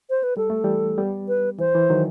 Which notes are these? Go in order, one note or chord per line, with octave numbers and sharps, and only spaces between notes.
C5
B4
G3 A4
A3
E3 G3
G3 B3
B4
E3 C5
E3
D#3 F#3